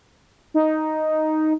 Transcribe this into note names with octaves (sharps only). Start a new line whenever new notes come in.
D#4